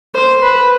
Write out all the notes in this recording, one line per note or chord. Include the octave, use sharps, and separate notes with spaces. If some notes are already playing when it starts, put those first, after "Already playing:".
C5
B4